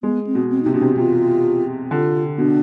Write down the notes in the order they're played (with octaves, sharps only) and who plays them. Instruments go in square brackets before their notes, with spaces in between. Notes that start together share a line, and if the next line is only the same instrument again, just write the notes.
[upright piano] G#3 [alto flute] B3
[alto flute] C4
[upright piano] B2
[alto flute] C4
[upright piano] C3 [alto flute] D#4
[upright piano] B2 [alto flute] D4
[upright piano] C3
[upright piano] C3 [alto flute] F4
[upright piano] D3 [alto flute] F4
[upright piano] B2 [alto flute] D4